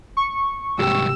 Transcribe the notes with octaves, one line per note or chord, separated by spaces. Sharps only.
C#6
C2 G#2 G4 G5 E6